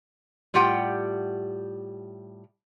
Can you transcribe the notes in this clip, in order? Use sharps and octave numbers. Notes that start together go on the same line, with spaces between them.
A2 G3 F4 G4 F#5 G5